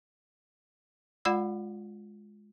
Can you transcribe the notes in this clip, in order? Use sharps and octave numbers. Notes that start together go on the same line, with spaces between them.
G#3 F4 D5 F#5 B5 E6